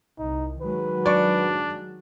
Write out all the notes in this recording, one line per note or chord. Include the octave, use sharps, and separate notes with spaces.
C2 D#4
D#3 F#3 G#3 B4
D4 D5 C#6